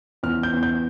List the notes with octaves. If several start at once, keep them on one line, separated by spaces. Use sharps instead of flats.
E2 F6
G6
E2
G6